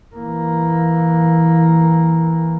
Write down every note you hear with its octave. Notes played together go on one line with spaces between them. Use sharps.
E3 A#3